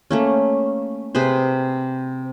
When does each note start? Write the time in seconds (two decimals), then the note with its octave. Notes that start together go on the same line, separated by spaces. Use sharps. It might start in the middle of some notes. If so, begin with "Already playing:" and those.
0.11 A3 A#3 C#4
1.15 C3 G#4 B4 C5